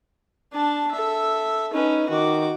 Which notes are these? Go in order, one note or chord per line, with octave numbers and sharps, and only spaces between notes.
D4 A5
A4 E5
C#4 D#4 B4
D#3 F#4 D6